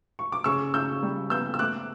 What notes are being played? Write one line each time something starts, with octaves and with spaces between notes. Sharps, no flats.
C#6
D6
C#3 C#6 E6
C#3 E6 G6
G3
B3 E6 G6
E6
A3 D6 F#6